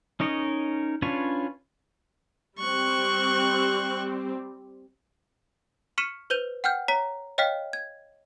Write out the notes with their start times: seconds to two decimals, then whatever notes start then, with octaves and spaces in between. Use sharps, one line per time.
0.20 C#4 D#4 A#4 C#5 D#5
1.02 C#4 D4 F4 B4 C#5
2.59 G3 C4 C#6 F#6
5.98 C#6 F6 B6 C#7 D#7 E7
6.30 B4 C5 G6 D#7 F7
6.64 F#5 G5 F6 G6
6.88 C#5 A#5 B6
7.38 C#5 D#5 F5 G5 F6 B6
7.73 G#6